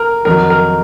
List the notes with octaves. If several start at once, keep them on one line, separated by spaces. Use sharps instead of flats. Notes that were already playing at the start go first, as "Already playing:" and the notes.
Already playing: A#4
F2 D#3 F#3 A#4
A#4